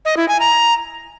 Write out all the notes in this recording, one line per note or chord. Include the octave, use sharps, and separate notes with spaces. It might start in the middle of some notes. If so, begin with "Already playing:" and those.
D#5
E4
G#5
A#5